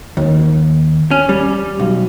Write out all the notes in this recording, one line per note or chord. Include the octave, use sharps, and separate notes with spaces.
D#2
C#4
G3
B1